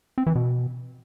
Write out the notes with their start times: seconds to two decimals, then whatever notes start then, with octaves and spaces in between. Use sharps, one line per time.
0.18 C4
0.26 E3
0.35 B2